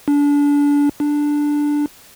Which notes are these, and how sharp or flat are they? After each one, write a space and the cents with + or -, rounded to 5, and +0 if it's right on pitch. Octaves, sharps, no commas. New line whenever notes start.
D4 -30
D4 +0